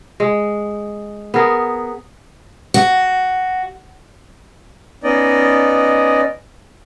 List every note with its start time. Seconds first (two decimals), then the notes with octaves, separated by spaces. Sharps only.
0.20 G#3
1.34 B3 G#4 A#4
2.74 F#4
5.03 B3 C#4 D#4 D5 D#5